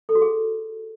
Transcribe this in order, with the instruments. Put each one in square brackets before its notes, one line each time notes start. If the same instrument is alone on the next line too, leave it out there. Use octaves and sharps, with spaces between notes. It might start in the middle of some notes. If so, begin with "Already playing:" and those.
[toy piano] A4
F#4
G#4